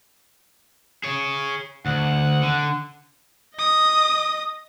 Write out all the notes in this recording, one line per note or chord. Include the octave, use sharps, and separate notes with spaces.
G#4 C#5
D2 F#5
D3
D#5 D#6